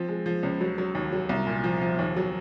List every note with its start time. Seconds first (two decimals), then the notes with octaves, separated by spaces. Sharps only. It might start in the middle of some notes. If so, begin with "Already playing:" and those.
Already playing: F3 C4
0.09 G#3
0.26 F3
0.43 C#2
0.61 F#3
0.78 F#3
0.95 D#2
1.13 F#3
1.29 C2
1.47 A#2
1.64 F3
1.81 F3
1.99 D#2
2.16 F#3